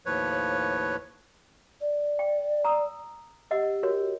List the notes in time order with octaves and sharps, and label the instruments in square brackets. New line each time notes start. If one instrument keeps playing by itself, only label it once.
[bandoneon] D#2 A2 F3 B4 C#5
[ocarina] D5
[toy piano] G5
A#5 D#6 E6
[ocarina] G4 [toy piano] D#5 F#5 E6
[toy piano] F#4 A#4 C#5